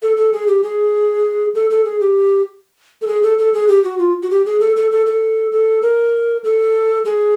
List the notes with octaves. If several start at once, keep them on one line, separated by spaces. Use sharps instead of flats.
A4
A4
G#4
G4
G#4
A4
A4
G#4
G4
A4
G#4
A4
A4
G#4
G4
F#4
F4
F#4
G4
G#4
A4
A4
A4
A4
A4
A#4
A4
G#4